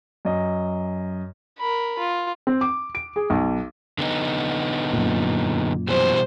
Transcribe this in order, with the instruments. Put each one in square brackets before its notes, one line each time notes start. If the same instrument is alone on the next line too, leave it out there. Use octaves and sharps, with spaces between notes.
[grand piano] F#2 D#5
[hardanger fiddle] A#4 B5
F4
[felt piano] C4
D6
D7
G#4
B1
[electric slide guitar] D3 B3 D#4
[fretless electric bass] F#2 A#2
[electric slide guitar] B2 E3 G3 [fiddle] C5